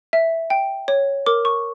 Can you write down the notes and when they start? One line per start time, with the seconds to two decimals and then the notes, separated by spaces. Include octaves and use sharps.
0.13 E5
0.50 G5
0.88 C#5
1.26 A#4 D6
1.45 C#6